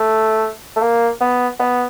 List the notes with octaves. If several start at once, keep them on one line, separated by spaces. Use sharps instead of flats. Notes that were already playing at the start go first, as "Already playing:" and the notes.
Already playing: A3
A3
A#3
B3
B3